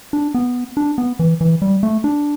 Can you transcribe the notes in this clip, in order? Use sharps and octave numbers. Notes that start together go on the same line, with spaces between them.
D4
B3
D4
B3
E3
E3
G3
A3
D4